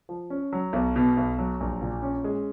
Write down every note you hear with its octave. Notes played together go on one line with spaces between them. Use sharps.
F3
C#4
F#3
B1
B2
B1
F#3
A#1
A#2
C#4
G#3